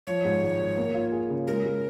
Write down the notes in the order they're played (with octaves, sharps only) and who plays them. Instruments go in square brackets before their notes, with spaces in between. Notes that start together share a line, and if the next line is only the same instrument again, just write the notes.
[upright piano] F3 [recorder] C#5
[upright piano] G#2
G#1
G#1
A#3
F4
G#4
C#3
[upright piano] G#3 [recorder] A#4
[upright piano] G#3